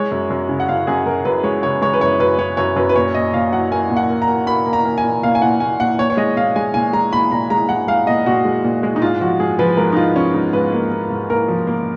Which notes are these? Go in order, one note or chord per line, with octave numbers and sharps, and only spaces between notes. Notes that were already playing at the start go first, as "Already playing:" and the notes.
Already playing: G#3 C#5
F#2
F#2
C#3
F#5
F#2 F5
F#2 G#4
F#2 A#4
F#2 B4
G#3 C#5
C#3 C#5
G#3 C#5
B4
F#2 C#5
F#2 B4
F#2 C#5
F#2 C#5
F#2 B4
B4
A#2 C#5
A#2 D#5
A#2 F5
F#3 F#5
A#3 G#5
A#2
F#5
A#3
A#5
A#3
A#3 B5
A#3
A#5
A#3
G#5
A#2
A#2 F5
G#5
A#2 F#5
A#2 G#5
A#2 F#5
A#2 C#5
C#5
G#3 D#5
A#2 F5
G#3 G#5
A#2 G#5
G#3 A#5
A#2 B5
A#2 A#5
G#3 A#5
G#3 F#5
G#3 F5
A#2 D#5
A#2 F#4
G#3
A#2
G#3
D#4
G#2 F4
F3 F#4
G#2 G#4
F3 B4
G#2 A#4
D#4
G#2 F4
F3 C#4
G#2 D#4
G#2 B4
A#3
A#3
G#2
A#3 A#4
F3
A#3